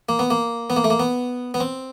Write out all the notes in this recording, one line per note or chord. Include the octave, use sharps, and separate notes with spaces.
A#3
B3
A#3
B3
A#3
A3
A#3
B3
B3
C4